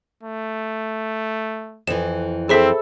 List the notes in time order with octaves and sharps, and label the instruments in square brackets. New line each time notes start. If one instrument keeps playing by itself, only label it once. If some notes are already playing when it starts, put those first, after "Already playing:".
[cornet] A3
[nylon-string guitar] F2 E3 [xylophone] E7
[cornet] C4 [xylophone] G#4 C5 B6 [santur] A4 E5 B5